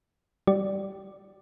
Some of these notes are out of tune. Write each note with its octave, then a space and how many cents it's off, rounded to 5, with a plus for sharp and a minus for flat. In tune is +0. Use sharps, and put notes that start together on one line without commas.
G3 +0 G4 -30 D5 +0